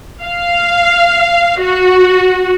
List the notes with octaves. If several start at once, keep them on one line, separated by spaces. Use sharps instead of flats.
F5
F#4